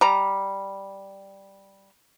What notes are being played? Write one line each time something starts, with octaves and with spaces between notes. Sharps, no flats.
G3 A#5